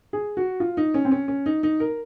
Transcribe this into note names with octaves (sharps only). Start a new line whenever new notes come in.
G#4
F#4
F4
D#4
C#4
C4
C#4
C#4
D#4
D#4
A#4